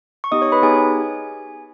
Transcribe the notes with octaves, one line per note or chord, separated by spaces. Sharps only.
C#6
B3 D#4 G4 D#5 D#6
C#5 C#6
B4 B5
B3 D#4 G4 G#4 G#5